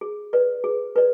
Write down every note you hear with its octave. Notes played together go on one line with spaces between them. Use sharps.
G#4
B4 D5
G#4
B4 D5